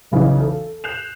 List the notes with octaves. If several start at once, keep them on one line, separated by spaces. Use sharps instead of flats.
B1 C#3 E3 D#4
A4
F#6 G6 C7 E7 F7